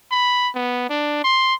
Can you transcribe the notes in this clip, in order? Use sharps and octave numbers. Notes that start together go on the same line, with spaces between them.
B5
B3
D4
C6